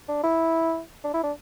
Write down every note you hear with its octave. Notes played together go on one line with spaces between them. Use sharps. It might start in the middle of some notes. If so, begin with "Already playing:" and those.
D4
E4
D4
E4
D4